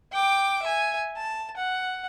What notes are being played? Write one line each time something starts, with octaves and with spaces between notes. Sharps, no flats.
G5 D6
E5 G#5
A5
F#5